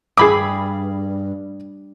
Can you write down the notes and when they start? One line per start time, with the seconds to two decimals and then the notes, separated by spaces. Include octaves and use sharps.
0.17 G2 G#4 B5 D6